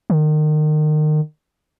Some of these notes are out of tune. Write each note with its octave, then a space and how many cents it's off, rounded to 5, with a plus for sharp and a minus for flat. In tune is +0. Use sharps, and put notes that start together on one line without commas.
D#3 -30